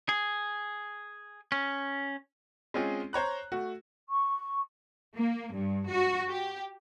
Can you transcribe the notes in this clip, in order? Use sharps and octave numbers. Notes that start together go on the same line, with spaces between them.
G#4
C#4
G#3 C4 C#4 F4 G#4
C5 C#5 A#5 F#6
A3 F#4
C#6
A#3
G2
F#4
G4